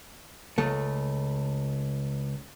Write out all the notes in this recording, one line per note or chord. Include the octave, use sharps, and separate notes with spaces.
C#2 A3